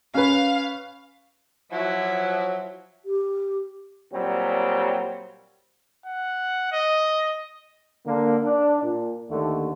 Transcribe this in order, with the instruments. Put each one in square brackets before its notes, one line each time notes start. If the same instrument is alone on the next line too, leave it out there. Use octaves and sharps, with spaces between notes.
[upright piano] C#4 B4 [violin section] F5
[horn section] F3 F#3 [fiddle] E4
[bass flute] G4
[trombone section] A#2 F#3 G3 C4
[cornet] F#5
D#5
[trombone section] D3 A#3
D4
A#2
D#2 D3 A3